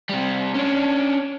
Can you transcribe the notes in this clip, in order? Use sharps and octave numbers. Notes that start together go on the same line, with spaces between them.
C3 G3
C#4 D4